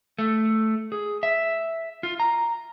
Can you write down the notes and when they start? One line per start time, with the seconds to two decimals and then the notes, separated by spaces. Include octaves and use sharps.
0.19 A3
0.92 G#4
1.23 E5
2.03 F4
2.20 A#5